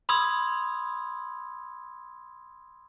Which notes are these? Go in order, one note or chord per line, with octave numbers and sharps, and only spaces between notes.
B5 C6 D#6 E6 G#6